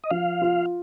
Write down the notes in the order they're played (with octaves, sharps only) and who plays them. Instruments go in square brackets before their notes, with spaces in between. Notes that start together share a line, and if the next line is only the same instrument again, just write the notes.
[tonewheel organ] D#5
[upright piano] F3 [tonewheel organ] F5
[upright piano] F4